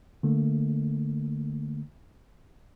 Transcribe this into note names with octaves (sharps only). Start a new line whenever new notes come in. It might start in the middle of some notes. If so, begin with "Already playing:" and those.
D3 A3 A#3